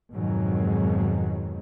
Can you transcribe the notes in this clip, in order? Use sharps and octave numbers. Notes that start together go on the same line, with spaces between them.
F2 G#2 B2 D#3 F#3 G#3